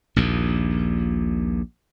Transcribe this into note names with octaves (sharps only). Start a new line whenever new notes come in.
A#1 D#2 A#2